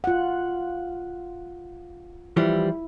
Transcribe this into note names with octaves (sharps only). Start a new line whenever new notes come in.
F4 F#5
E3 F3 G3 E4